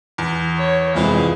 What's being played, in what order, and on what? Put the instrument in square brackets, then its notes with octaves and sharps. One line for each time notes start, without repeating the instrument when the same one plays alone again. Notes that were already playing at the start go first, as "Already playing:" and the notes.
[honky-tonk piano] E2
[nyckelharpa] C#5 C#6
[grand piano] C2 F2 G#3 [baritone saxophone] E3 [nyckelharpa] G#4 F5